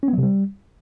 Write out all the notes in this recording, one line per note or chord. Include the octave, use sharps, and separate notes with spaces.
C#4
B3
F#3
C3
G3